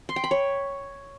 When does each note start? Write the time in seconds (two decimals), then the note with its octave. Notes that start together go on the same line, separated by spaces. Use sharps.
0.09 C6
0.16 G5
0.24 B5
0.31 C#5